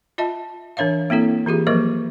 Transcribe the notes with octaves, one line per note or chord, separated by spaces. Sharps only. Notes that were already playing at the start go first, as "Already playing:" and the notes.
F4 D#5 E5 A5
E3 D4 C#5 E5 F5
A#3 C4 E4 A4
E3 F4 G4 G#4
F3 F#3 A#3 A#4 D#5